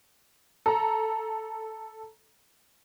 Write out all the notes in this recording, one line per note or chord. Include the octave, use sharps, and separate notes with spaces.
A4 A#5